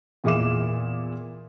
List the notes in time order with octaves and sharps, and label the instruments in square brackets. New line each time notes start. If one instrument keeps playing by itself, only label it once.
[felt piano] E2 A#2 G#4 E5 D6 E7